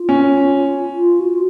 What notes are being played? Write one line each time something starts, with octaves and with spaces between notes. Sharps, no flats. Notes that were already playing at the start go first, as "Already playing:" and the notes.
Already playing: F4
C#4
F4
F#4